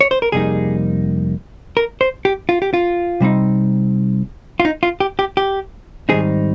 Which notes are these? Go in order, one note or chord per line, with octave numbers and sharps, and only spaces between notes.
C#5
C5
A#4
F2 C3 G3 A#3 D#4 G#4
A#4
C5
G4
F4
G4
F4
C3 G3 C4 D#4
F4
D#4
F4
G4
G4
G4
G#2 D#3 G3 C4 D#4 G#4